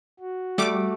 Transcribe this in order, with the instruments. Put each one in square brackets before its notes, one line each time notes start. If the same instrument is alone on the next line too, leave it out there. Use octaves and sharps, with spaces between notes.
[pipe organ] F#4
[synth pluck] G3 D6 [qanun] A3